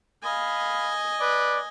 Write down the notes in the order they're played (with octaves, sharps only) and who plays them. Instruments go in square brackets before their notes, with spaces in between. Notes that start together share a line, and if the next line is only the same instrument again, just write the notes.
[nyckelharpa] D#5 G#5 [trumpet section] F5 B5
[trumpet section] B4 D5